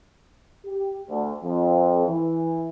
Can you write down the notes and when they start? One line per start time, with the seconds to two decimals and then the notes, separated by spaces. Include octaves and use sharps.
0.66 G4
1.10 D2
1.44 F2
2.07 E3